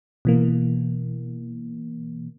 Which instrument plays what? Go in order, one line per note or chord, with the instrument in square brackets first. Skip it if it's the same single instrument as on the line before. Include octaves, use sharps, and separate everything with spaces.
[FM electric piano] B2 E3 A#3